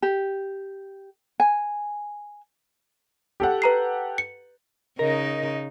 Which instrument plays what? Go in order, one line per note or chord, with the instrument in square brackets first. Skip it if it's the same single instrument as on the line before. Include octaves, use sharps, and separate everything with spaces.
[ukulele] G4
G#5
[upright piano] G4 A4 F#5
[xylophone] B4 A#5 C7
C#7
[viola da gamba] C#3 D#4 [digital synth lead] A#4 [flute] D#5